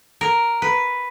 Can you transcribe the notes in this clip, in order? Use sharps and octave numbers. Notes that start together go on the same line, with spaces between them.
A#4
B4